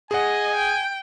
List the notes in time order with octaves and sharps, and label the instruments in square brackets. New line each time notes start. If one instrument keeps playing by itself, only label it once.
[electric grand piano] G#4 F#5 [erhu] D#5 [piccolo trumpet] G#5
[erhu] G5